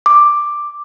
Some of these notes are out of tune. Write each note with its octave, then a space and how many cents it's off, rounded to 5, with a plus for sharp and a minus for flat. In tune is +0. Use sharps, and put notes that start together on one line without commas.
D6 +5